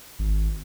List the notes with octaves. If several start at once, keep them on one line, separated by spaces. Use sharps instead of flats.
G#1